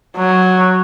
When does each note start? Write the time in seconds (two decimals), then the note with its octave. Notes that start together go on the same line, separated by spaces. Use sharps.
0.18 F#3